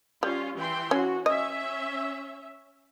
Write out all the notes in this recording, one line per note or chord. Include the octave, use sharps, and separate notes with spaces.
G3 C#4 F4
E3 G5 C6
C#4 F#4
C#4 D#5 E5